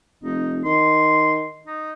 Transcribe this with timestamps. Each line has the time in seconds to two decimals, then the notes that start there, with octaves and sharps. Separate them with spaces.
0.23 F1 D#4
0.65 D#3 C6
1.67 D#4